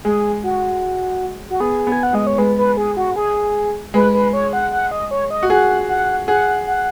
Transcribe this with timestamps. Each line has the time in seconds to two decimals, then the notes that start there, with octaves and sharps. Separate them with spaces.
0.05 G#3 G#4
0.44 F#4
1.50 F#4
1.60 B3 G#4
1.87 B3
1.92 G#5
2.03 F#5
2.13 G#3 D#5
2.27 C#5
2.38 G#3 B4
2.58 B4
2.77 G#4
2.97 F#4
3.16 G#4
3.94 G#3 B4
4.14 B4
4.33 C#5
4.53 F#5
4.72 F#5
4.91 D#5
5.11 C#5
5.31 D#5
5.43 F#4
5.50 G#4 F#5
5.89 F#5
6.28 G#4 F#5
6.67 F#5